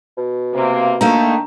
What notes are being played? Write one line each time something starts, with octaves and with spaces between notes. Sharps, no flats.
B2
C3 A#3
D#3 A3 A#3 D4 D#4 A#5